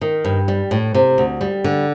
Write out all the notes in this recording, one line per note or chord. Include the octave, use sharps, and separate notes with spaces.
D#3
G2
G3
A2
C3
D2
G3
D3